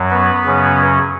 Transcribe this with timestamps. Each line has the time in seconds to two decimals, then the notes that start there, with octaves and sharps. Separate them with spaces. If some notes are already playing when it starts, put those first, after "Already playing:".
Already playing: F#2 F#3
0.11 B3 B4
0.45 F#2 C#3 F#3 C#4